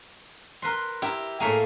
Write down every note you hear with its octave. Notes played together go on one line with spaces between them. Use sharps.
A#4 B4 C6
E4 G4 A#4
A2 A3 A#3 G#4 A#4